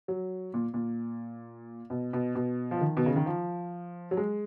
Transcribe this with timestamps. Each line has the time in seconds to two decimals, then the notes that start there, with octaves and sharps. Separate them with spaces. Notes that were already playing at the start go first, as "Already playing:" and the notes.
0.08 F#3
0.54 A#2
0.74 A#2
1.90 B2
2.13 B2
2.35 B2
2.71 F3
2.81 D#3
2.97 B2
3.06 C#3
3.16 D#3
3.26 F3
4.11 F#3
4.17 G#3